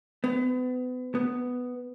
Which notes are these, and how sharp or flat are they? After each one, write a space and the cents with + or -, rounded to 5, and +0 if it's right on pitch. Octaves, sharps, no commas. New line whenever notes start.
B3 +35
B3 +5